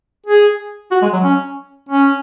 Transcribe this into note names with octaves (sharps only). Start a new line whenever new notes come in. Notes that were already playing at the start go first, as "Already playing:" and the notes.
G#4
F#4
G#3
F#3
C#4
C#4